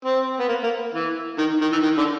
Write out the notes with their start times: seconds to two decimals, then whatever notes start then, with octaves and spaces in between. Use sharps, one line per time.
0.05 C4
0.40 B3
0.49 A#3
0.64 A#3
0.94 E3
1.38 D#3
1.62 D#3
1.72 E3
1.83 D#3
1.98 D3